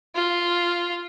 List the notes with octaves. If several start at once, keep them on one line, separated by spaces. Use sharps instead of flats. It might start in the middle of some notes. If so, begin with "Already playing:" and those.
F4